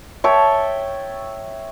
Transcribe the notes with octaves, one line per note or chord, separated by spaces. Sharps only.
C#5 E5 G5 A5